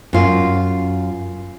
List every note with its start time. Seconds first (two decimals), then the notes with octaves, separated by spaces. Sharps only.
0.13 F#2 F4